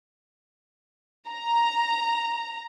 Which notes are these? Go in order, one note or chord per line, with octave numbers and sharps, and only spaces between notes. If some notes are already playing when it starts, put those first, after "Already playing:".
A#5